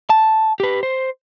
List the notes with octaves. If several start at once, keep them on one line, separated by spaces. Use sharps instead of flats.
A5
G4 B4
C5